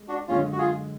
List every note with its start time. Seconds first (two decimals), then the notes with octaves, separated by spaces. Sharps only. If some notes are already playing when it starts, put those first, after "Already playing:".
Already playing: G#3
0.08 D4 F#4
0.28 F#2 D3 G#3 C#4 F4
0.52 F#4
0.58 F4 G#4